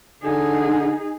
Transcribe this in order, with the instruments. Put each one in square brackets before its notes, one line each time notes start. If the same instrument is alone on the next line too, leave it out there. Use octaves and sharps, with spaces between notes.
[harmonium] D3 [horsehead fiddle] D#4 G#4